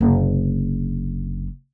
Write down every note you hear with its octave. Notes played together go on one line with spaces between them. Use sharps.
F#1 C3